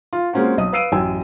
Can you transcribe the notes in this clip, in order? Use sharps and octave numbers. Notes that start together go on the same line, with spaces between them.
F4
G#3 A#3 C4 C#4 F4 F#4
B1 D#5 D#6
B4 F5 E6 C7 D7 D#7
A1 F#2 G5 G#5 E6